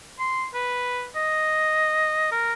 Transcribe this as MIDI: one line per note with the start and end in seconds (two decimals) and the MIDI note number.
0.19 0.47 84
0.54 1.07 71
1.16 2.31 75
2.32 2.53 70